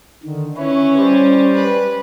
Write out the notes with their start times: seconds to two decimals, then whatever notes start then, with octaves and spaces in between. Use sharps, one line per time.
0.23 D3 D#3
0.57 C#4 E4 B4 C#5
0.98 G3 C5 D5
1.54 B4